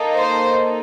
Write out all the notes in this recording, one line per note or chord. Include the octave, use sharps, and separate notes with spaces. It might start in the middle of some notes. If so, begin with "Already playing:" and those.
Already playing: A#3 D#4 A4
C5